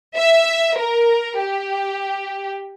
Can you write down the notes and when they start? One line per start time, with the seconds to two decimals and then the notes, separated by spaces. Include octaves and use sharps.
0.16 E5
0.78 A#4
1.39 G4